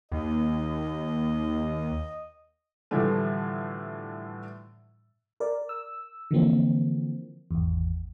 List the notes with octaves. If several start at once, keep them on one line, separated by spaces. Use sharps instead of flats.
D#2 D#5
A2 D3 E3 F3 G3 A3
A#4 D5
E6
D3 E3 F3 A#3 C4
G#1 E2